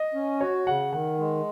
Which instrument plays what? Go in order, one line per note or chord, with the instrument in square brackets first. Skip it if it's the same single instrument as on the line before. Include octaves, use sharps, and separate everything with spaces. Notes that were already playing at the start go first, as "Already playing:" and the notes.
Already playing: [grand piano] D#5
[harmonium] C#4
[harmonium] F#4 [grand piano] C#5
[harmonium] C#3 [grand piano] F#5
[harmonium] D#3 [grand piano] F#5
[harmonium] G#3